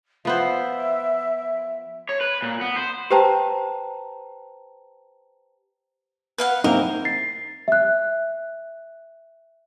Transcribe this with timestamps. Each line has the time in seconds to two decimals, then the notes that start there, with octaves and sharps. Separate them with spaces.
0.25 F3 B3 C5 E5
2.09 C#5
2.21 B4
2.42 A#2
2.61 B3
2.76 C5
3.11 G4 B4 C5 G5 A5 A#5
6.38 B4 F5 F#5
6.64 A#3 C4 D#4 E4 A#4
7.05 A6 C7
7.68 E5 F#6